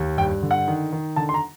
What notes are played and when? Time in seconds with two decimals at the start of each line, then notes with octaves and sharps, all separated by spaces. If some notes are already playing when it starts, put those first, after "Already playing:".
Already playing: D#2
0.18 G2 G5
0.43 D3
0.51 F#5
0.68 D#3
0.93 D#3
1.16 D3 A5
1.29 C6
1.34 A#5